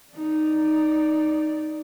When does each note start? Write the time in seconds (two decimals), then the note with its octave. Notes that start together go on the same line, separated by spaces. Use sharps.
0.13 D#4 D5